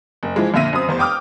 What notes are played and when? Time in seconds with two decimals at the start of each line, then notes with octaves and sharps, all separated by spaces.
0.23 F#1
0.36 E3 F3 G#3
0.54 F2 A#2 D3 E5 A#6 D#7
0.73 F#2 C4 D#6
0.88 F1 E2 C5
0.99 G5 D6 D#6 F6